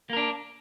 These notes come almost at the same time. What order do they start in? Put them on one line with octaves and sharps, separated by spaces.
A#3 A#4 D4